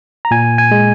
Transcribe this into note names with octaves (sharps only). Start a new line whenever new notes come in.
A#5
A#2 G#5
G#5
G#3